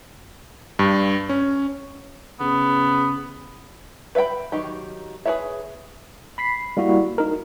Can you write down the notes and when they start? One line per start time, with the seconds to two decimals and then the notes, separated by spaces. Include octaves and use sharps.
0.79 G2
1.29 C#4
2.40 C#3 B3
4.15 B4 E5 F5 G5 B5
4.52 D#3 F#3 D#4 G4
5.25 G#4 A#4 B4 C#5 E5
6.38 B5 B6 C7
6.77 G3 A#3 E4 F#4
7.18 D#4 A#4